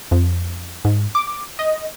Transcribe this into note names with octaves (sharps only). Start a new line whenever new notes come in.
F2
G#2
D6
D#5